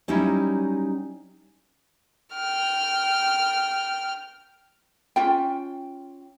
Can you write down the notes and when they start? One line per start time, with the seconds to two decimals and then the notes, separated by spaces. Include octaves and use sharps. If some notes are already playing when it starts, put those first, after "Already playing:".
0.08 F#3 G3 C#4 D#4 E4
2.34 G5 F6
5.16 C#4 F4 G5